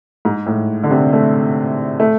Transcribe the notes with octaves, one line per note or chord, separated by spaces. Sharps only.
G#2
A2
D3
C3
A3
A3